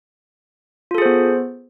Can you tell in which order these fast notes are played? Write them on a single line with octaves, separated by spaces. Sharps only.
F4 A4 G#4 C5 B3